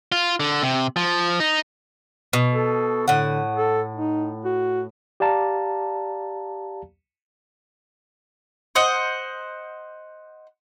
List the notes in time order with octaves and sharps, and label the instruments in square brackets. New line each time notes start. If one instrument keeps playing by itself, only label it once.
[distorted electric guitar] F4
D3
C3
F3
D#4
[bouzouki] B2
[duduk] A4
[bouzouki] A2 F#5 [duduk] D3
[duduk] A4
D#4
F#4
[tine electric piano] G4 D5 F5 A5 A#5
[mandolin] C5 D#5 F#5